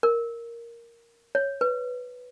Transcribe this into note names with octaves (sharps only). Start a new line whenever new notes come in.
A#4
C#5
B4